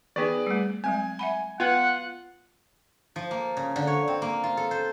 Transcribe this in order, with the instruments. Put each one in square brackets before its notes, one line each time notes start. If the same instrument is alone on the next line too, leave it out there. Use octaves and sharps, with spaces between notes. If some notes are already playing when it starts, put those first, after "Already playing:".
[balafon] E3 B3 D#4 [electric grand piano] G#4 B4 D5
[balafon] G3 A3
[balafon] F#3 G#3 C4 [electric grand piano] G#5
[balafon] E5 F#5 B5
[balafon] B3 B4 G5 [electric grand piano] F4 [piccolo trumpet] F#5
[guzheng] F3
A#3
C#3
D3
C#5
C4
A#3
F4
A4
C5